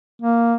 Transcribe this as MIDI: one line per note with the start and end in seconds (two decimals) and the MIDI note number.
0.22 0.56 58